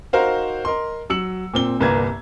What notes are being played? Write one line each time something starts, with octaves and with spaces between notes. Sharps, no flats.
D#4 F#4 A#4 C5 F5
A#4 D#5 C6
F#3 E6 C#7 F#7
A#2 C4 G7
G1 C2 A#3 B4 A#5 G#6